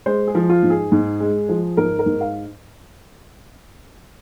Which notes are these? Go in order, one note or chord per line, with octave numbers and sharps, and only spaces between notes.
G#3 C5
G#4
F3
F4
G#2
G#4
G#2
G#3
F3
G#2 A#4
A#4
G#2
F5